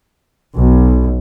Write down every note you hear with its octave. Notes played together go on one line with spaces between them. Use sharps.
B1